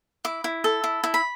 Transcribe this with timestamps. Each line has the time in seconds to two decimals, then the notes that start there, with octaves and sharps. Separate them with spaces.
0.25 E4 D6
0.44 E4
0.64 A4
0.84 E4
1.04 E4
1.14 B5